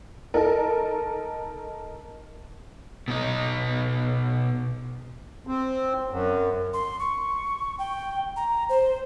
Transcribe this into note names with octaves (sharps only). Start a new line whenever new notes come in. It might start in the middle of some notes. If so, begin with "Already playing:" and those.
D#4 A4 A#4
B2 D#4
C4
F#2
C6
C#6
G5
A#5
C5